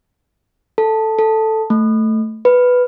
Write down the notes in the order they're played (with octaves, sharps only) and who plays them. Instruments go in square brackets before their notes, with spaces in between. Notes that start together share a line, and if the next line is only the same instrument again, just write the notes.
[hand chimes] A4
A4
A3
B4